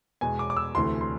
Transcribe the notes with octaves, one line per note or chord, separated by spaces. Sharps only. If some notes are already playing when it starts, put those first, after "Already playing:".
E2 B2 G#3 G#5
D6
D6
E6
D2 C3 E3 A3 C6
C6